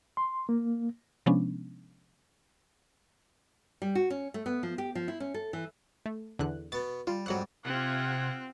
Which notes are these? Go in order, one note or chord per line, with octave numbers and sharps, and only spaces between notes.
C6
A#3
C3 F3 G#3 B3 C#4 D4
G3
F#4
C#4
A3
B3
F3
G4
F3
E4
C#4
A4
E3
A3
E2 D3 F#6
B2 B3 A6
G3 F4
F2 G#2 F#3 G3 F#5 F#6
C3 C4 F4 G4 F#5 G#6